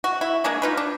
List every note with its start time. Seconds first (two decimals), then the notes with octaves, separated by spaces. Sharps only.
0.04 F#4
0.21 E4
0.44 G#3 A#3 D4 G#4
0.62 D#4 F4 B4
0.77 D4